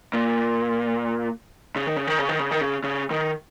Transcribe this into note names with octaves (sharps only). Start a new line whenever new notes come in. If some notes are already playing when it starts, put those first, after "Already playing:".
A#2
C#3
D#3
C#3
D#3
C#3
D#3
C#3
D#3
C#3
C#3
D#3